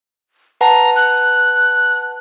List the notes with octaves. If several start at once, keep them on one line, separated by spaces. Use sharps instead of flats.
B4 F#5 A5 A#5
F#6